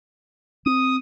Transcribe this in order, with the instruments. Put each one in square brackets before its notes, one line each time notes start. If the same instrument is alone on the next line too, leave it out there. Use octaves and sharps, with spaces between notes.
[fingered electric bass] C4 [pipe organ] D#6